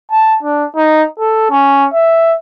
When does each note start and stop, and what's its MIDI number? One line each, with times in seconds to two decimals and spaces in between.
0.11 0.34 81
0.43 0.64 62
0.76 1.03 63
1.19 1.46 69
1.51 1.86 61
1.94 2.35 76